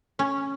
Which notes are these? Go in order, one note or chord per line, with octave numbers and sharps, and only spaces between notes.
C#4